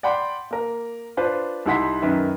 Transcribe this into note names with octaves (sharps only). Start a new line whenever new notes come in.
D5 F#5 G5 B5 C6
A#3 A#4
D4 F4 B4 C5
C2 D#4 E4 F#5 C6 B6
F#2 D#3 B4 E5